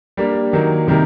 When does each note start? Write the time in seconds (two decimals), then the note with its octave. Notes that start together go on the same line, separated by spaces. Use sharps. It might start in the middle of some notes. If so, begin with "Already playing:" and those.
0.17 G3 A#3 D4
0.53 D#3 F#3 A#3
0.87 C3 D#3 G3 A#3